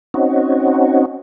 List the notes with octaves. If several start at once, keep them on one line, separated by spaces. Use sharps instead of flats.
C4 C#4 D#4 F#4